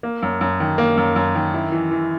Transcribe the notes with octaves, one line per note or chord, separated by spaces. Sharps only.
A#3
F#2
F#2
D#3
A#3
F#2
F#2
D#3
E4
E3
E3